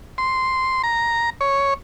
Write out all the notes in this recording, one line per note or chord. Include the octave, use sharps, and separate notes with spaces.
C6
A#5
C#5